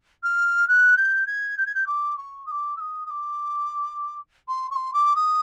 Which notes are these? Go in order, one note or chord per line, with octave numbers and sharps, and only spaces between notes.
F6
F#6
G6
G#6
G6
G#6
G6
D6
C#6
D#6
D6
E6
D#6
D#6
D6
C6
C#6
C6
D6
D#6